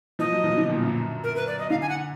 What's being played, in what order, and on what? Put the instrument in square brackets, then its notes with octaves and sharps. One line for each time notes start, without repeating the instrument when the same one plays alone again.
[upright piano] F3 [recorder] D#5
[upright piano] F#3
F3
B2
D3
A#2
F#2
[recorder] A#4
B4
D5
D#5
[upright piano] D3 [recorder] F5
[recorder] G#5
F#5